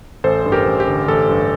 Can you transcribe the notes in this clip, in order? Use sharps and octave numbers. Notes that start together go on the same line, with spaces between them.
A1 A4 C5
G2
G4 A#4
A1
G4
D3
A1 A4
G2